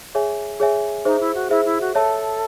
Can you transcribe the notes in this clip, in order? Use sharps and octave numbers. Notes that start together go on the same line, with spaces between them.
G#4 C#5 E5 G#5
G#4 C#5 E5 G#5
D#4 G#4 C5 E5
E4
F#4
E4 G#4 C5 E5
E4
F#4
A4 C#5 E5 A5